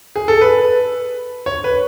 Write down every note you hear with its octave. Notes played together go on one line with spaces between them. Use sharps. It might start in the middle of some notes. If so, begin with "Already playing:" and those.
G#4
A4
B4
C#5
B4